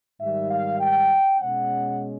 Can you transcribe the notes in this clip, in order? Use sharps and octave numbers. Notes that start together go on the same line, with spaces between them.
G#2 D#3 G3 E5
F5
G5
B2 G#3 C#4 F#5